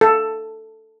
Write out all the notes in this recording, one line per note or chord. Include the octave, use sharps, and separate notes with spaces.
A4